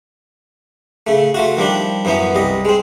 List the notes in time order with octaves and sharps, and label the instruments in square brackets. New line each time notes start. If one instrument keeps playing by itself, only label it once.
[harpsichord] C#3 A3
A3 F4 F#4
D#3 F3 G3 D4
F#2 E3 F#3 B3 C#4
C2 G3 D#5
G#3 C4